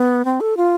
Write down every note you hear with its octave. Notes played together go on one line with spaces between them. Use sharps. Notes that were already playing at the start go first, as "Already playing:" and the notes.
Already playing: B3
C4
A4
F4